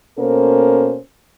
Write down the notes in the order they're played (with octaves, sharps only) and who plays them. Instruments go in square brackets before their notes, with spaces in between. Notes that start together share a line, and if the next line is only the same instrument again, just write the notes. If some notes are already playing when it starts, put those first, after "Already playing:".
[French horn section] B2 A#3 C#4 A4 A#4 C5